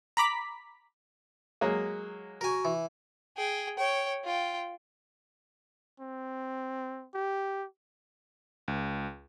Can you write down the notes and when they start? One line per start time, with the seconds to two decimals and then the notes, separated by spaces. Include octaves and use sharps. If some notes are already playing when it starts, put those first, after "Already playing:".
0.17 A#5 B5 D6 B6
1.61 F#3 G#3 A#3
2.41 F#4 A#4 G#5
2.65 E3
3.37 G#4 G5
3.78 C#5 G5
4.25 F4 G5
6.00 C4
7.14 G4
8.68 C#2